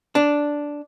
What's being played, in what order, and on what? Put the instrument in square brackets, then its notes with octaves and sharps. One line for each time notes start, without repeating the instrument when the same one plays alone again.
[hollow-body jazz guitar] D4